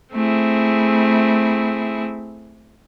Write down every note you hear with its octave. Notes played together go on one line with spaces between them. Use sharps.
A3 C4 E4 G#4